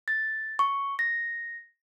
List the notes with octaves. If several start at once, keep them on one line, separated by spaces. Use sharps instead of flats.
A6
C#6
A#6